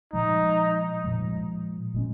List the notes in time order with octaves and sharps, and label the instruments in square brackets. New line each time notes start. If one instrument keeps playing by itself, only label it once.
[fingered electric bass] A#2 F3 G#3 [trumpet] D#4
[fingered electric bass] A#2 F3 G#3
A#2 G#3 C#4